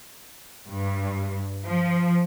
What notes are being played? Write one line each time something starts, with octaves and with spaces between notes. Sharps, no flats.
G2
F3